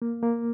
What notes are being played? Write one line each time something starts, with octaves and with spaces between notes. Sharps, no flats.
A#3
A#3